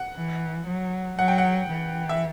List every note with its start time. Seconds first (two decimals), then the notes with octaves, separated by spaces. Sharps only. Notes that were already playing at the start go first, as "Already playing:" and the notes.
Already playing: F#5
0.16 E3
0.67 F#3
1.18 F#3 F#5
1.28 G5
1.38 F#5
1.69 E3
2.09 E5